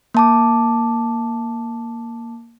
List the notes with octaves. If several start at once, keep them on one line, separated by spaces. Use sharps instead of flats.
A#3 A5 D6